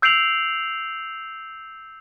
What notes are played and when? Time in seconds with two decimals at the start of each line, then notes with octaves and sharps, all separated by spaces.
0.02 E6 G6 C7 D7 F7 F#7